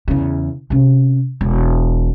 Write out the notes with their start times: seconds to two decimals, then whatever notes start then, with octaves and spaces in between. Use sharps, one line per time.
0.08 E2 C#3
0.70 C3 C#4
1.41 E1